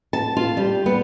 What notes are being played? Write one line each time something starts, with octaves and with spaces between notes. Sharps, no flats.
A5
F4
G3
B3